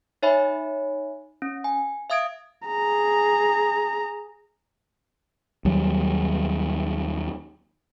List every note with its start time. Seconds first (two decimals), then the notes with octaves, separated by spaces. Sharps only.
0.22 D#4 C#5 E5 G#5 B5
1.42 C#4
1.64 G#5
2.10 E5 F5 D#6 G#6 D7
2.67 G#4 A#5
5.65 D#2 F#3 G3